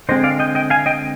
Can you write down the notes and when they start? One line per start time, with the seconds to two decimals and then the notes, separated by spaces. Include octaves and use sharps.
0.09 D3 G#3 C4 C5 D#5
0.24 D5 F5
0.40 D#5 G5
0.55 D#5 G5
0.70 F5 G#5
0.86 D#5 G5